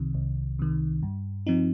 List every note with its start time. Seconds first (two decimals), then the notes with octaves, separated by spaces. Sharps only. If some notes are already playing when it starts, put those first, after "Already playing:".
Already playing: C2 C3 D#3
0.14 C2
0.59 C3 D#3
1.03 G2
1.47 F3 C4 D#4